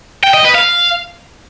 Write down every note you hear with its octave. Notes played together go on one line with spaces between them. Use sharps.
G5
D#5
B4
F5